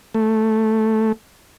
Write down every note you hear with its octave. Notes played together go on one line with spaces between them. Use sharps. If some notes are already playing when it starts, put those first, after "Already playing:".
A3